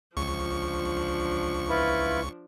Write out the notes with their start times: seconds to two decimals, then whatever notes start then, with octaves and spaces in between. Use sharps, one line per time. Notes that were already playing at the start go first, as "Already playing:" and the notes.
0.17 C#2 F3 D4 C#6
1.69 E4 F4 B4